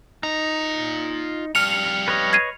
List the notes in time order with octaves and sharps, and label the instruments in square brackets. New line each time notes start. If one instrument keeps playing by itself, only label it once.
[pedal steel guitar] D#4 [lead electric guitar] F4 A#5
[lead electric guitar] F2 G3 [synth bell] F6 C#7 F7
[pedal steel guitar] B4 C#5 D#5
[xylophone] G#6 C7 D#7